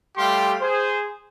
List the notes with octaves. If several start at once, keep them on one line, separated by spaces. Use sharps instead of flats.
G3 A3 G4 F5 C6
G#4 C5